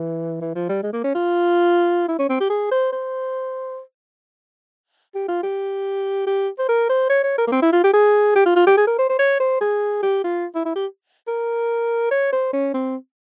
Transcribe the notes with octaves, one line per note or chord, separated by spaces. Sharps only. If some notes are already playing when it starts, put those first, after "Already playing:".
Already playing: E3
E3
F3
G3
G#3
A#3
C#4
F4
E4
C#4
C4
G4
G#4
C5
C5
G4
F4
G4
G4
C5
A#4
C5
C#5
C#5
A#4
A#3
C4
E4
F4
G4
G#4
G4
F4
F4
G4
G#4
A#4
C5
C5
C#5
C5
G#4
G4
F4
E4
E4
G4
A#4
C#5
C5
C#4
C4